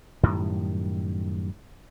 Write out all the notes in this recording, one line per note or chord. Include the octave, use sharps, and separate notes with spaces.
F#2 A2 D#3 G3